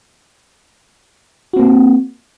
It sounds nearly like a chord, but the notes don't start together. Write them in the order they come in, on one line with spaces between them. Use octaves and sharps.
F#4 C4 A#3